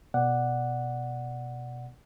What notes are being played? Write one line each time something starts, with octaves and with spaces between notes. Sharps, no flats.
B2 D5 F#5